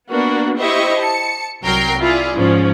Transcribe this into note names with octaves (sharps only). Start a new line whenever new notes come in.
A#3 B3 D4 F#4
E4 G4 C5 D#5 E5 C#6
A5 C#7
C2 F#3 A#4 G5 C7
E4 F4 G#4 D5
G#2 F3 C#4